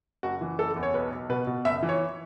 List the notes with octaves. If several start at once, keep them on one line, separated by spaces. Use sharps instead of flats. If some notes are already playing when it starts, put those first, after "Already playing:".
F#1 F#4
E3
F#1 A4
E2
C#5
B1 B4
B1
B2 B4
B2
F#1 E5
E3
C#5